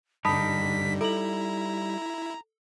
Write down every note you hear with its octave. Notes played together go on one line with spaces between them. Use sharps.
G2 D3 G3 D#4 A5 B5 D#6 B6
E4 A4 A#5 F#7